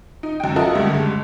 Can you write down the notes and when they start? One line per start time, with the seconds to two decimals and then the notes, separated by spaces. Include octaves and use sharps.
0.23 D#4
0.40 F#2 G5
0.56 F4 F#4 A4 A#4 D#5 E5
0.75 C#2 G2 D3 G3 A3
0.90 F#1 G#3